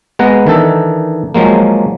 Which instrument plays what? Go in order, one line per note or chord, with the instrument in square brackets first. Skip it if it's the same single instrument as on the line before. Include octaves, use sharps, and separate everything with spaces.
[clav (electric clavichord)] G#3 B3 F#5 A#5
D#3 E3 D4 D#4 A4
F3 F#3 G#3 A#3